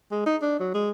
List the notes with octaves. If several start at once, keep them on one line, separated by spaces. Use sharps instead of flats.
G#3
D#4
D4
F#3
G#3